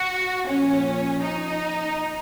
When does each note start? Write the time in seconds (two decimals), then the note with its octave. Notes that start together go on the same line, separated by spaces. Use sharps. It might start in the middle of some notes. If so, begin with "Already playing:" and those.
Already playing: F#4
0.47 A#2 F3 C#4
1.21 D#4